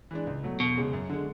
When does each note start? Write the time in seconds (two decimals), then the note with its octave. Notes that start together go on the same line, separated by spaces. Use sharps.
0.11 E3 G#3 D4
0.27 C#2
0.43 B2 F#3 A3
0.60 E1 B2
0.77 E2 C#3 G#3
0.93 F#2
1.09 D3 G#3